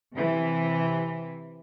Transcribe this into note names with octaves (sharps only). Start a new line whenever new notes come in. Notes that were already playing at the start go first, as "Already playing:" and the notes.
C3 E3